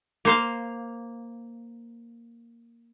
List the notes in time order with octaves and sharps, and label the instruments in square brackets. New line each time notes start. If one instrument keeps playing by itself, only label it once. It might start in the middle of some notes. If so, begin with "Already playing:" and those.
[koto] A#3 C5 F5